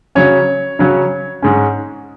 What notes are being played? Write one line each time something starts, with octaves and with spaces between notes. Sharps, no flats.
C#3 F#3 C#4 C#5
C#3 F#3 C#4
G#2 G#3 C#4